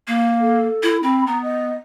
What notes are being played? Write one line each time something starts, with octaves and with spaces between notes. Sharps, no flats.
A#3
A4
E4
C4 B5
B3 A#5
D#5